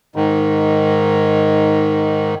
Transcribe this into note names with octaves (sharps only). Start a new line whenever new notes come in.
G#2 D#3